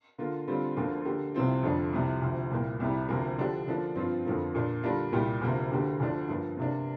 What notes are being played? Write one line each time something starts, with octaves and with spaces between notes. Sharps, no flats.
D3 A#3 F4
D3 G3 C4 F4
D2 D3 F3 A#3 F4
D3 A#3 G4
C2 C3 F3 C4 F4
F2 D3 F3 D4
C2 C3 F3
D2 C3 F3
C2 A#2 A#3
C2 C3 G3
D2 C3 F3 A#3
D3 F3 D4 G4
D3 F3 A#3 D4
G2 F3 C4 F4
F2 D3 F3 A#3 F4
A#2 A#3 D4
D3 G3 A#3 D4 F4
C2 A#2 G3 A#3 G4
D2 C3 F3 A#3
D2 D3 A#3 G4
D2 D3 F3 D4
G2 F3 A#3
C3 A#3 D4